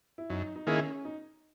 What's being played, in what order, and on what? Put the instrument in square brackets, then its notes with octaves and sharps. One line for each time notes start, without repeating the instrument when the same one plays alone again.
[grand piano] E4
[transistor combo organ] F#2 [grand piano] D#4
[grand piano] D#4
[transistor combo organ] D#3 A#3 E4 G#4 [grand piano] C#4
[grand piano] D#4